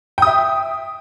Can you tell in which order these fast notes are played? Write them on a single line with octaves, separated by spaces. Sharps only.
G5 D#6 E5